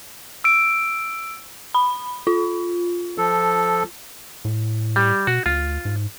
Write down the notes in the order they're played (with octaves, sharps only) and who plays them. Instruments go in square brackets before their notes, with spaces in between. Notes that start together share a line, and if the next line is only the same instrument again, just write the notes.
[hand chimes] E6 D7
[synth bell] B5
F4
[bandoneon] F3 A4
[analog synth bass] A2
[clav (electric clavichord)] G3
[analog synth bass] B2 [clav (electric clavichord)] F#4
[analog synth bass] D2 [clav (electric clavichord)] F4
[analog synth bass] G#2